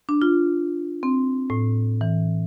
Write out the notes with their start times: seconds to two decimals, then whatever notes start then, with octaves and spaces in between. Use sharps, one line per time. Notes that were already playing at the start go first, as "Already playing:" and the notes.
0.09 D4
0.22 F4
1.03 C4
1.50 A2
2.01 E3